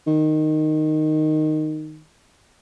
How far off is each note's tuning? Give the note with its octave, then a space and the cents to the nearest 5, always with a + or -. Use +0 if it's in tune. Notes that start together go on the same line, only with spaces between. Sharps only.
D#3 -10